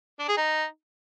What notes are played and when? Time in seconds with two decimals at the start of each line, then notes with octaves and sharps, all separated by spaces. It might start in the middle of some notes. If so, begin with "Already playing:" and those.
0.19 D4
0.28 G#4
0.37 D#4